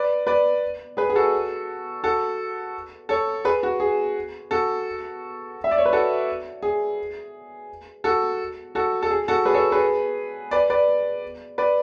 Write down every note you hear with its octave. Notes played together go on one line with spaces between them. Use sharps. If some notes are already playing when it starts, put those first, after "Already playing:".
Already playing: B4 D5
B4 D5
G#4 B4
G#4
F#4 A4
F#4 A4
A4 C#5
G#4 B4
F#4
G#4
F#4 A4
E5
D5
C#5
B4
F#4 A4
G#4
F#4 A4
F#4 A4
A4
G#4
F#4 A4
G#4 B4
A4 C#5
G#4 B4
B4 D5
B4 D5
B4 D5